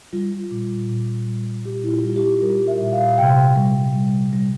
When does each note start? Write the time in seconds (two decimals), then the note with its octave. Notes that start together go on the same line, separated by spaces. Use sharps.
0.13 G3 F4
0.51 A#2
0.89 A#2
1.27 G3
1.65 A#2 G4
1.84 E4
1.91 F4
2.04 G3 F4
2.16 G4
2.42 G3 A#4
2.68 E5
2.80 A#2
2.93 F5
3.18 C3 G5
3.56 G3
3.95 G3
4.33 G3